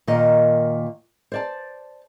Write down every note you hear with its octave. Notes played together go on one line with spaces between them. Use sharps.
A#2 D#3 A#4 D#5
C5 D5 A5